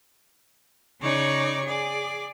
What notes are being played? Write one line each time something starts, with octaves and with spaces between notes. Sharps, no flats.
C#3 D#4 C#5 D5 C#6
G#4 D5